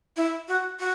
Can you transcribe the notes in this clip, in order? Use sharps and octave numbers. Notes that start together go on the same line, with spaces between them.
E4
F#4
F#4